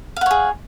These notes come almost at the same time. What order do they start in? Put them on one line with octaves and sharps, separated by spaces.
F5 F#5 C#5 G#4